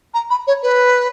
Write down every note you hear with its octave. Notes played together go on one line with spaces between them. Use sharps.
A#5
B5
C#5
B4